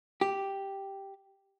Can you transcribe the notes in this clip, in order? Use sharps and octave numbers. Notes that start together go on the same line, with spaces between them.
G4